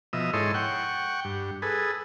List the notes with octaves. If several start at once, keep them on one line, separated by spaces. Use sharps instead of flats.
B2 F3 D#5 E5
G#2 E4 A4 C#5 D#5 C6
F#5 G5 C#6
G2
G#4 A4 B4